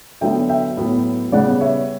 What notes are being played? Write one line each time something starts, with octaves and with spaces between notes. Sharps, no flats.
D3 F#3 B3 E5 G5
E5 G5
A2 F#3 B3
C#3 G3 B3 D5 F#5
C#5 E5